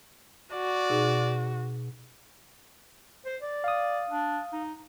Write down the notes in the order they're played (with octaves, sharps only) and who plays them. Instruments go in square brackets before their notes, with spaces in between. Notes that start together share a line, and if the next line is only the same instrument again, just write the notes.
[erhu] F#4 [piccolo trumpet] D5
[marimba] B2 D#4 G#4
[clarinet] C5
D5
[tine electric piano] F5 D#6
[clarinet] D4
D#4